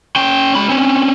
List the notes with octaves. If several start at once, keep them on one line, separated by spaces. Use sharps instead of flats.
C#4 G5
G#3 B5
C4 C#4